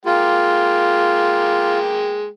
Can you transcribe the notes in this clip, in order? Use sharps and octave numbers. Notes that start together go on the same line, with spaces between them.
G#3 A#3 F4 G5